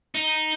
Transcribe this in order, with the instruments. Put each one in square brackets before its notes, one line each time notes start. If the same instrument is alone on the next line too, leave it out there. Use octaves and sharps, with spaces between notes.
[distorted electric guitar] D#4